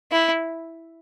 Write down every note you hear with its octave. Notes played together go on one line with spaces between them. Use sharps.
E4